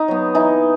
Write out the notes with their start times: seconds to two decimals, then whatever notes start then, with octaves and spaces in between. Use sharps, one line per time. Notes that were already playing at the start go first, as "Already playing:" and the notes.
Already playing: D#4
0.08 F#3 B3
0.35 E3 D#4